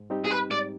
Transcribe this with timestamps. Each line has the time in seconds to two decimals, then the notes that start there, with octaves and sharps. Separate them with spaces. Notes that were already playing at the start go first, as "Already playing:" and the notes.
Already playing: G#2
0.10 G3 C4 D#4 G4
0.24 G#4
0.31 B4
0.50 G#2 D5